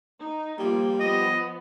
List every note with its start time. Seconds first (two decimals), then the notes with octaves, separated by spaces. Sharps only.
0.19 D#4
0.59 F3 G3 A#3 F4
1.00 F3 B3 D#5